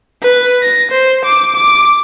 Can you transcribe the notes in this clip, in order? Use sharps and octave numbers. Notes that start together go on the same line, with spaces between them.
B4
A#6
C5
D6
D6